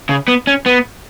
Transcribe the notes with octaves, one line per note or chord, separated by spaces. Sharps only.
C#3
B3
C#4
B3